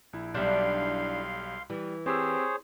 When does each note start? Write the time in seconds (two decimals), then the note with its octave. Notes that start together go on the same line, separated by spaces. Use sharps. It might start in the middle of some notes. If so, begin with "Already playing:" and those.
0.13 A#1 E4
0.34 B1 G3 D4 E4 F5 C6 G6
1.70 E3 G3
2.06 C4 G4 G#4 C5 C#5 E6